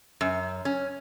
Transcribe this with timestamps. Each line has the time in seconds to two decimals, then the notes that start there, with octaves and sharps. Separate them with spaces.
0.21 F#2
0.65 C#4